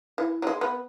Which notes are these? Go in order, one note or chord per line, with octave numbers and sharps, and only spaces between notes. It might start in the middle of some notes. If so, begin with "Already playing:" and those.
E3
F#3
G#3
B3